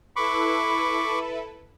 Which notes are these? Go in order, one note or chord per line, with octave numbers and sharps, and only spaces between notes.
E4 A4 B4 B5 C#6 D6